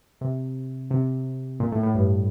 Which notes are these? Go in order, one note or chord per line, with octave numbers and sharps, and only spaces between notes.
C3
C3
A#2
A2
A2
G2